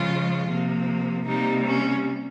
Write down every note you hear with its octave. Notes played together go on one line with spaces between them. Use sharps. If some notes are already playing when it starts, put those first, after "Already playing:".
Already playing: C#3 F3 G#3 F4
C3 F3 A#3
C3 G3 A#3 D#4
C#4